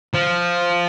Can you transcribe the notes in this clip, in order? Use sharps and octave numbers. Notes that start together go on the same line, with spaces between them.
F3